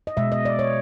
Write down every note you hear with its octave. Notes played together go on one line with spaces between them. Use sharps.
D#5
B2 G#3 E5
D#5
D5
C#5